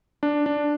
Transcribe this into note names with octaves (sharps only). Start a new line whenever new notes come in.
D4
D4